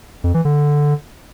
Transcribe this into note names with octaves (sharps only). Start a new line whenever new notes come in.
F2
E3
D3